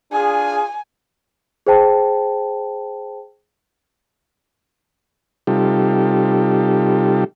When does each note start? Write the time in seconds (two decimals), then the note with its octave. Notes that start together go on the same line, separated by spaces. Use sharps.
0.12 D4 F4 G#4 G#5
1.67 G#4 C5 G5 A5
5.47 C3 G3 D#4 F4 G4 A4